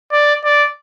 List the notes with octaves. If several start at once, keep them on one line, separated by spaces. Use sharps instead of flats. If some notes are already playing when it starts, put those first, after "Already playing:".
D5
D5